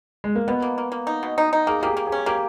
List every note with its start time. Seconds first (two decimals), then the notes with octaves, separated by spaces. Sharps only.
0.24 G#3
0.35 A#3
0.48 B2 B3
0.62 A#3
0.78 A#3
0.92 A#3
1.07 D#4
1.23 B2
1.38 D#4
1.53 D#4
1.67 A#3 G#4
1.83 A#3 G4
1.87 G#4
1.97 A#3
2.07 G#4
2.12 C#4
2.26 A#3 G4